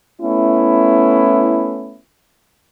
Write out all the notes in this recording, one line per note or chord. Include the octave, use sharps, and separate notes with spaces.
A3 B3 C#4 E4